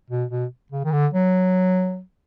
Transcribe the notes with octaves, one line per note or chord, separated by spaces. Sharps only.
B2
B2
C#3
D#3
D3
F#3